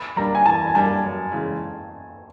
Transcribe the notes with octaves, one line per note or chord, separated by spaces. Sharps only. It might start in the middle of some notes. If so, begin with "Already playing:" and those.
Already playing: B5
G3 A#3 D4 A#5
G#5
E3 A5
G#5
G3 A#3 D4 A5
F#2
C#3 E3 G#3